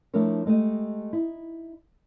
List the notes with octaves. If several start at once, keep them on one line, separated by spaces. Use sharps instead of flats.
F3 A3 D4 E4 A#4 C#5
G#3 A3 G4 D#5
D#4 E4